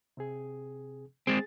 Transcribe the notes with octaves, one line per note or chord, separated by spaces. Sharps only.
C3 C4 G#4
G#3 C4 G#4 A6